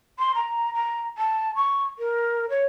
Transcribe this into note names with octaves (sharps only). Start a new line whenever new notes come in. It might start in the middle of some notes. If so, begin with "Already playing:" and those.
C6
A#5
A#5
A5
C#6
A#4
C#5